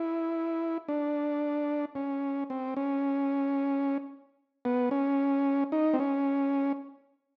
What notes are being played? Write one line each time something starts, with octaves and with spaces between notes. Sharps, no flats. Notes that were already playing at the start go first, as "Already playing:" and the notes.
Already playing: E4
D4
C#4
C4
C#4
B3
C#4
D#4
C4
C#4